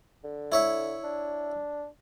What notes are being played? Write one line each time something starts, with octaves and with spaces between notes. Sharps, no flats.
D3
E4 C#5 E5
D4